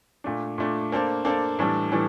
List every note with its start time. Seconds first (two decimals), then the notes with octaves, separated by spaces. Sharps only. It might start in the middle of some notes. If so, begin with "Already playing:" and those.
0.24 A#2 A3 D4
0.58 A#2 A3 D4
0.92 A#3 D4 A4 C5
1.25 A#3 D4 A4 C5
1.59 A2 E3 G3 D4 A4
1.92 A2 E3 G3 D4 A4